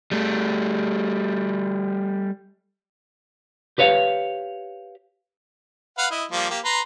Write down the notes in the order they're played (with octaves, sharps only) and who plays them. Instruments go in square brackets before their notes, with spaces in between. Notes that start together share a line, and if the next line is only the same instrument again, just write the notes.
[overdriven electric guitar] G3 A3
[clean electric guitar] G4 B4 C#5 F5
[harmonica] B4 F5 F#5
E4 D#5
F3 G3 A#3
A#3 G4
B4 A#5 C6